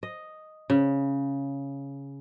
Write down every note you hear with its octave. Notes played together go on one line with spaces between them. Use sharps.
D#5
C#3